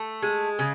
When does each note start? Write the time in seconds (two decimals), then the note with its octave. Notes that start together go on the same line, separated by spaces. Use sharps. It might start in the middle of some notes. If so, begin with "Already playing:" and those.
Already playing: A3
0.23 G#3
0.59 C#3